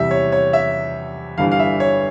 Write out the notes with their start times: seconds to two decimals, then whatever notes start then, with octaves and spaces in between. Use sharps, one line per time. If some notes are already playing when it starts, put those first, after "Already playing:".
Already playing: E2 C3 G3 E5
0.11 C#5
0.32 C#5
0.53 E5
1.38 G1 G2 E3 G3 F5
1.52 F5
1.59 E5
1.80 C#5